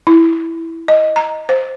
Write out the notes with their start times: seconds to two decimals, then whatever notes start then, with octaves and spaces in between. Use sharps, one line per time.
0.07 E4
0.88 D#5
1.16 A#5
1.49 C5